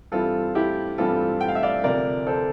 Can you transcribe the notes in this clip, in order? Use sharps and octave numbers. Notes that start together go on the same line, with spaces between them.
G2 E3 G3 C4 E4 F4 A4
E4 G4
G2 E3 G3 C4 E4 F4 A4
G5
F5
E5
D5 F5
D2 C3 F3 A#4 D5
A4 C5